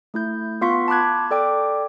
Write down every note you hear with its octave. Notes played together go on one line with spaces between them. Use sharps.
A3 E4 G6
B3 F4 F5 C6 C#6 B6
A5 B5 D6 F#6 G#6
A4 D5 G5 D6